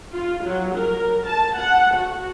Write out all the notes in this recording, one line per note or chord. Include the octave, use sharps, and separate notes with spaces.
F4
F#3
A#4
A5
F#5
F#4